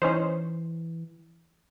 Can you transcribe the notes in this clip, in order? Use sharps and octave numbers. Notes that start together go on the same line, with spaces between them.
E3 C#4 D#4 C5